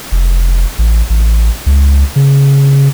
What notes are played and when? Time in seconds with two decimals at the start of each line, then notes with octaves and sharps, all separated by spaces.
0.12 F1
0.79 A1
1.10 A1
1.66 C#2
2.16 C#3